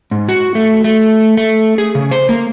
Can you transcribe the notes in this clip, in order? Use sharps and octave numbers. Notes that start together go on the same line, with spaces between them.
G#2
F#4
A3
A3
A3
G#4
C#3
C5
A#3